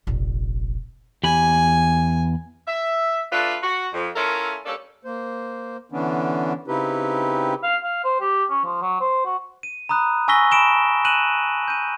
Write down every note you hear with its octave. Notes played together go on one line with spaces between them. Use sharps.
F1 A#1
E2 G4 G#5 B5
E5
A3 D4 F4 B4
F#4
F2
A3 C#4 E4 F4 A4 A#4
G3 A#3 C#4 D4 A4
A#3 C5
D3 E3 B3 C#4 D4
C#3 C4 D#4 E4 G4 B4
F5
F5
C5
G4
C#4
F3
F#3
C5
F#4
D#7
A#5 B5 D#6 F#6
G#5 C#6 E6 A#6 B6 G7
A5 B5 D#6 D7 E7 G7
F#6 D#7 E7 F#7
G6 D#7